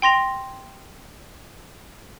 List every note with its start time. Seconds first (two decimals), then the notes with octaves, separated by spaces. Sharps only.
0.02 G5 C6 A#6 F7